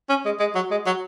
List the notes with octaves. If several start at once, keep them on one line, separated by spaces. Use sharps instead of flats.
C#4
G#3
G#3
F#3
G#3
F#3